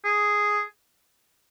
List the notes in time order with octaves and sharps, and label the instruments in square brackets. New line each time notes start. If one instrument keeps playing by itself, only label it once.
[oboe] G#4